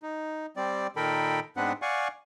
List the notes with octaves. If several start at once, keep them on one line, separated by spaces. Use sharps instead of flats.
D#4
G3 C4 D5
A#2 D#3 A4 A#4 G5 B5
G#2 B3 C4 D4 B4 F#5
D5 F5 F#5 G#5 C#6